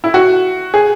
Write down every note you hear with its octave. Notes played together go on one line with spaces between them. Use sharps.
E4
F#4
G#4